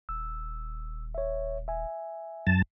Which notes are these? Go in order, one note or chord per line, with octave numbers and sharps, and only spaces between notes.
D#1 E6
C#5 E5
E5 G#5
F#2 A5